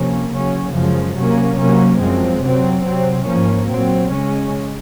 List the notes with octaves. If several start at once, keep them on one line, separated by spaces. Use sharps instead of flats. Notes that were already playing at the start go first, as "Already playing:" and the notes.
Already playing: C3 F3 A#3 C#4
C#3 F#3 C#4
F#2 C#3 F3 G#3
C3 F#3 A#3 C#4
C3 F#3 A#3 C#4
F#2 F3 G#3 C4
C3 F#3 C4
C3 F#3 C4
G#2 F3 A#3 C#4
A#2 F#3 C4
C#3 G#3 C#4